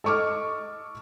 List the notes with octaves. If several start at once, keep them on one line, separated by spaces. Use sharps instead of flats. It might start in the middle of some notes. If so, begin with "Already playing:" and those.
A4 D#5 C#6 D6 F6